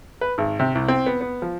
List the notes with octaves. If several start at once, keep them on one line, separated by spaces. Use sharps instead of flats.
B4
G#1
C3
C2
C4
B3
B3
F3